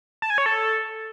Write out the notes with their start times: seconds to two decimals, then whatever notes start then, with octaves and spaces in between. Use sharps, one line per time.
0.22 A5
0.30 G#5
0.38 C#5
0.46 A4